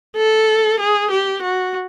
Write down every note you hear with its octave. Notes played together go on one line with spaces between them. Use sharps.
A4
G#4
G4
F#4